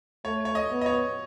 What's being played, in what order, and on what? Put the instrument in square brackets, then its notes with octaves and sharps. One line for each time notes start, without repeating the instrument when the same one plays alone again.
[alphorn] A3 [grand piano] C#5
[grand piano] C#5
D#5
[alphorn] B3
[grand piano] D#5
C#5